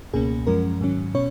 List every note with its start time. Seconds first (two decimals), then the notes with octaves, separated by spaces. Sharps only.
0.14 C#2 B2 A#3 C#4 G#4
0.47 F#2 F3 G#3 C#4 A#4
0.81 G#2 D#3 F#3 C#4
1.14 B2 C#4 C#5